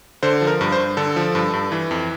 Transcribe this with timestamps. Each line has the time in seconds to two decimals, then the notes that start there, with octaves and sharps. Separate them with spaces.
0.23 D3 C5
0.41 F3
0.47 A#4
0.61 G2
0.72 C5
0.78 G2
0.97 D3 A4
1.16 F3
1.35 G2
1.53 G2
1.72 E3
1.91 F2